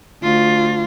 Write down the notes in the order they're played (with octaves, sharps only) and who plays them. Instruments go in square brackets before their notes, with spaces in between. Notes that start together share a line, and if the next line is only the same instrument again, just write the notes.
[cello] D2 F4